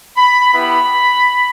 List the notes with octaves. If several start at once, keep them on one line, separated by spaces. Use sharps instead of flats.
B5
B3 E4 G4 B5